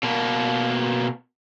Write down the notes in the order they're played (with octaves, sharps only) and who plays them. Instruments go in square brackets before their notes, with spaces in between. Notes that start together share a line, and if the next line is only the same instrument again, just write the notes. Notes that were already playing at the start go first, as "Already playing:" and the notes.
[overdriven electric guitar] B2 A#3